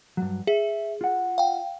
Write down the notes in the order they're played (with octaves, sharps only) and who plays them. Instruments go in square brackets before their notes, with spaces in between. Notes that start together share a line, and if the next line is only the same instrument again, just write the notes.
[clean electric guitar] G2 F#3
[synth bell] G#4 [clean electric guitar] E5
[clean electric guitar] F4 F#5
[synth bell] F5 G5